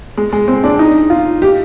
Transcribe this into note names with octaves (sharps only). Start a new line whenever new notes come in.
G#3
G#3
C4
D4
D#4
F4
G4